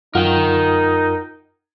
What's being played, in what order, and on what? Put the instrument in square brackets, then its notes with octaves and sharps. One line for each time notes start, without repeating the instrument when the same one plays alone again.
[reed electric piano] F#2 F4 F#5 [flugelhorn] D#4 [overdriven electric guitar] A#4 G5